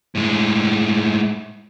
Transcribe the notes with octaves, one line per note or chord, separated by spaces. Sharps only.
A2 G#3